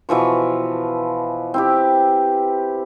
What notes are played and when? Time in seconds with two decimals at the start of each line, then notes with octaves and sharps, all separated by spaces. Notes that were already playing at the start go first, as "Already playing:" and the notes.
0.09 B2 E3 F3 C#6
1.54 C4 E4 G4